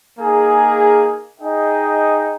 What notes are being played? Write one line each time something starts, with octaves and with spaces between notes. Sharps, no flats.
A#3 D#4 G#4
D#4 G#4 D#5 G5